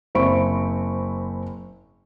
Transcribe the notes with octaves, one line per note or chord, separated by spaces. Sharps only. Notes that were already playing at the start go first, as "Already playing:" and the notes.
F#1 C4 B5 C#6 D7